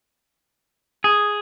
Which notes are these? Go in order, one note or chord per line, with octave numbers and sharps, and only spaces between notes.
G#4